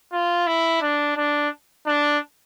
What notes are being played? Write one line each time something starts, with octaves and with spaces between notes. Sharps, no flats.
F4
E4
D4
D4
D4